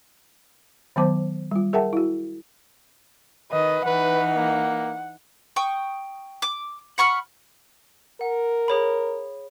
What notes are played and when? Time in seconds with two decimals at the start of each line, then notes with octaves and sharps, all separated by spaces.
0.96 D#3 F#3 B3 C5 A5 D6
1.51 G3 F4
1.73 G#4 A#4 E5 F#5 G5 A5
1.93 E4 F#4
3.52 D#3 B4 D#5
3.86 E3 D#4 B4 F#5
4.36 A#3
5.56 G5 C#6 D#6
6.42 D6
6.98 F#5 B5 C#6 F6
8.21 A#4 F#5
8.68 G#4 C#5 B5